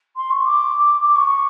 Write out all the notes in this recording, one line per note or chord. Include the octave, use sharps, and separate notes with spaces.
C6
C#6
D6
D6
C#6